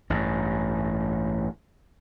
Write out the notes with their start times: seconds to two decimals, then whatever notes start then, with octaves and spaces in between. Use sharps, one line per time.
0.10 A1 G2